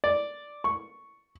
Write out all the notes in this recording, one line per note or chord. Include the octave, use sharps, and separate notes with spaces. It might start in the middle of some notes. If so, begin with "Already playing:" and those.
D5
C#6